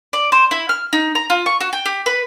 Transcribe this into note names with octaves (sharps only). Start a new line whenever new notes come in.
D5
C5
E4
F6
D#4
A#5
F4
C#6
F#4
G5
G4
B4